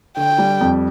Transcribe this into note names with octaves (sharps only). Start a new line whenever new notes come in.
D3 G5
G3
F2